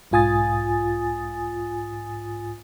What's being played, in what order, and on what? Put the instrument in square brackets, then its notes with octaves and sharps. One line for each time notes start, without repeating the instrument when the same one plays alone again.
[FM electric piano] B1 G#2 F4 G#5 D#6 A6